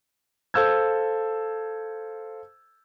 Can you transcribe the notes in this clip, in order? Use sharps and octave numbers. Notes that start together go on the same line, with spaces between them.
A4 C5 F5 E6 G6 G#6